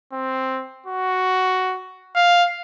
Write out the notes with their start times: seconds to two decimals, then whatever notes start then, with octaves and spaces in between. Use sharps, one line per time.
0.13 C4
0.86 F#4
2.15 F5